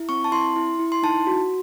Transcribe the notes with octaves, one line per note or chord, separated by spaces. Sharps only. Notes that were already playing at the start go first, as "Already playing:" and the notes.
Already playing: E4
C4 C#6
A5
E4 C6
E4
E4
C6
D#4 A5
F#4